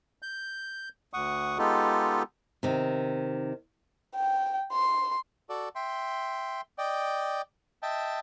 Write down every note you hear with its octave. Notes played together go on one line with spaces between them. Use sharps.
G6
D2 F#5 C#6 D#6
G#3 B3 D#4 F4 G4 A4
C3 D#3
G5
C6
F#4 A4 D5
E5 G5 C6
D5 D#5 G5
D#5 E5 G5 A5